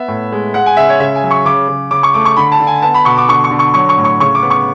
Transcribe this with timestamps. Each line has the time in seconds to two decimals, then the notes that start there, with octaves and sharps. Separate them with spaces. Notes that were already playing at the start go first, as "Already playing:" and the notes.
Already playing: B3 E5
0.08 A2
0.32 G#3
0.54 G#3 F#5
0.66 G#5
0.77 C#3 E5
0.89 C#5
1.00 C#3 E5
1.15 G#5
1.23 F#3
1.31 C#6
1.45 C#3 D6
1.68 C#3
1.91 C#3 D6
2.03 C#6
2.14 A3 D6
2.25 C#6
2.37 D3 B5
2.52 A5
2.60 D3
2.67 G#5
2.82 B3 A5
2.94 B5
3.05 B2 C#6
3.18 D6
3.29 D3 C#6
3.44 C#6
3.51 D3
3.59 C#6
3.74 F#3 C#6
3.89 C#6
3.98 A2
4.04 C#6
4.20 C#3 C#6
4.35 D6
4.42 B3
4.50 C#6